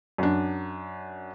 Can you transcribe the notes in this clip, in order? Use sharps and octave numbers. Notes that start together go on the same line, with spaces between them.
F#2 D4